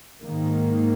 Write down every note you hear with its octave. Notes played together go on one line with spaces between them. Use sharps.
G#2 D#3 A#3